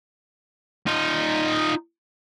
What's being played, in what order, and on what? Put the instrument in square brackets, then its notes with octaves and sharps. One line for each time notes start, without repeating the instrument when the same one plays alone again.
[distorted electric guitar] D#4 F4